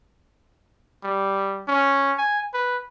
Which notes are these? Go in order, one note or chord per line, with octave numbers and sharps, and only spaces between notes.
G3
C#4
G#5
B4